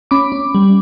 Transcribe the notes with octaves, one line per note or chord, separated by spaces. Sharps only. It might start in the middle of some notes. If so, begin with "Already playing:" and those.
C#4 B5 D6
C#4
G3